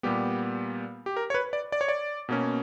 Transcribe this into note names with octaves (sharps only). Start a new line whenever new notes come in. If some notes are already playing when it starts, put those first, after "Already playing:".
A#2 G3 B3 G4
G4
A#4
C#5
B4
D5
D5
C#5
D5
B2 A#3 C#4